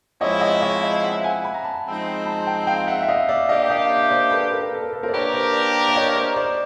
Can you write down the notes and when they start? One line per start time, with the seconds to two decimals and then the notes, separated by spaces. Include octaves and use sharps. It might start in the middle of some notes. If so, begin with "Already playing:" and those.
0.21 F3 G#3 C4 E4 C#5 D#5
0.41 C#5 D#5
0.62 C#5 D#5
0.83 D#5 F5
1.03 E5 F#5
1.24 F#5 G#5
1.45 B5
1.54 A#5
1.64 A5 B5
1.85 F3 G#3 C4 D#4
2.26 A5 B5
2.47 G5 A5
2.67 F5 G5
2.87 E5 F#5
3.03 E5
3.08 D#5 F5
3.29 D5 E5
3.49 A#3 D4 G4 D#5 F5
3.70 D#5 F5
3.90 D5 E5
4.11 C5 D5
4.31 A4 B4
4.42 A4
4.52 A#4
4.63 A#4
4.73 A4
4.83 A#4
4.93 A4 B4
5.03 A#4 C5
5.08 D5
5.13 A#3 D4 G4 A#4 B4 C#5
5.33 C5 D5
5.88 D5
5.96 C#5 D#5
6.15 C5 D5
6.36 C5 D5